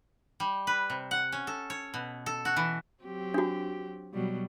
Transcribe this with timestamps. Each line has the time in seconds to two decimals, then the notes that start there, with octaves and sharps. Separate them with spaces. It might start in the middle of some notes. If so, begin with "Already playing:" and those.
0.40 G3
0.67 B4
0.90 C3
1.11 F#5
1.32 C#4
1.47 A4
1.70 C#5
1.94 B2
2.26 A4
2.45 F#4
2.56 E3
3.04 F#3 C4 G4
3.34 D4 F#4
4.13 B2 F#3 G3